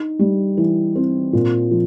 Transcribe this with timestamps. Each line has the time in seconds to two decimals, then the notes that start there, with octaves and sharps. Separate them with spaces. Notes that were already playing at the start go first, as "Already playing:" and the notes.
Already playing: D#4
0.19 G3
0.57 E3
0.95 C4
1.33 A#2
1.71 F3